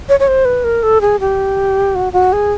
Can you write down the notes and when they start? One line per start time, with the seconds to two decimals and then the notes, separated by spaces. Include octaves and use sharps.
0.09 C#5
0.20 C#5
0.28 C5
0.45 B4
0.64 A#4
0.83 A4
1.01 G#4
1.20 G4
1.95 F#4
2.13 F#4
2.33 G#4